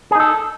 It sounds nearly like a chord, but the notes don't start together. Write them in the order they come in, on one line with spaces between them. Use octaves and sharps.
G#4 D#4 A4